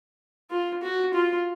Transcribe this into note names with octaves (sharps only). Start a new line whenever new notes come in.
F4
F#4
F4